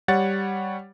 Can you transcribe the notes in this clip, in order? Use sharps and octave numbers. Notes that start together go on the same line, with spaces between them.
G3 C#5 F#5 A6